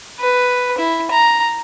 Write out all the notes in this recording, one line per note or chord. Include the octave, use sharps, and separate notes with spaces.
B4
E4
A#5